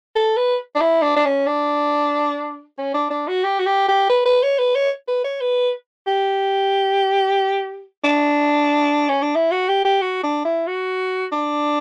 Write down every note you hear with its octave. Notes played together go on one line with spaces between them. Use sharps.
A4
B4
D4
E4
D4
D4
C#4
D4
C#4
D4
D4
F#4
G4
F#4
G4
G4
B4
B4
C#5
B4
C#5
B4
C#5
B4
G4
D4
C#4
D4
E4
F#4
G4
G4
F#4
D4
E4
F#4
D4